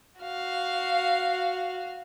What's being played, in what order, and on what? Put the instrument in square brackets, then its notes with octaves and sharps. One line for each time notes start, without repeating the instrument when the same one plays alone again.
[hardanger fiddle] F#4 F5